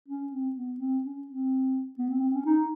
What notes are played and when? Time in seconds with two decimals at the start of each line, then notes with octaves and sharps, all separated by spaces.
0.08 C#4
0.32 C4
0.56 B3
0.80 C4
1.03 C#4
1.27 C4
1.98 B3
2.10 C4
2.22 C4
2.34 C#4
2.46 D#4